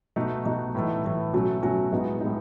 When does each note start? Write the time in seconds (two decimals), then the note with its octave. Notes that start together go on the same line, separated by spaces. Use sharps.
0.16 B2 A3 D#4 F#4
0.45 B2 A3 D#4 F#4
0.75 A2 E3 A3
1.04 A2 E3 A3
1.33 B2 F#3 A3 C#4 F#4
1.63 B2 F#3 A3 C#4 F#4
1.92 A2 G#3 B3 D#4
2.21 A2 G#3 B3 D#4